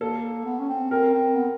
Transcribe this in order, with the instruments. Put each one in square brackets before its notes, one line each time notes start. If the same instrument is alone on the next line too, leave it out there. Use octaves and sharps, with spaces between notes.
[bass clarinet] A#3 [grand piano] A4
[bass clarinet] B3
C#4
C4
[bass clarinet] C4 [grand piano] A#4
[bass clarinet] C4
B3